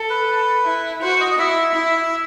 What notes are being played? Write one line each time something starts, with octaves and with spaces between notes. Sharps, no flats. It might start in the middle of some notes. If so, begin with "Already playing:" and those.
Already playing: A4
B4
E4
F#4 C5
D#5
D#5
E4 E5
E4